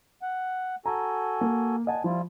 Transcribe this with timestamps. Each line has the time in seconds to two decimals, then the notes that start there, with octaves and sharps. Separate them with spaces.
0.22 F#5
0.86 F#4 A4 G#5 A#5
1.41 A#3
1.87 A#2 D#5 F#5 G#5 A5
2.04 F3 G3 E4 F4